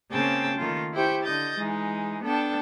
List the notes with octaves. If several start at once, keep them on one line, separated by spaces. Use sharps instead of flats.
C#3 A#3 C4 G5 A5 G#6
D#3 A3 A#3 F4
E4 G4 C5 G5 C#6
D3 D#5 G6 A6
E3 G#3 D#4
B3 D4 A4 G5 A5